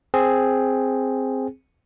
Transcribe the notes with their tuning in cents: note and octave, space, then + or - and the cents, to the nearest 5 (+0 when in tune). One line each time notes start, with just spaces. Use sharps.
C4 +0 G#4 +0